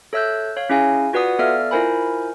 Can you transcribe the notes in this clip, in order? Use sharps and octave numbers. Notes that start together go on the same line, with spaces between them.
A4 C#5 E5 E6 F#6 G6
C#5 F5
C#4 E4 G#4 F5 G#5
F4 F#4 B4 D5 F#5 D#6
B3 A4 D5 E5 F5 F6
E4 F4 A#4 C5 G#5 B5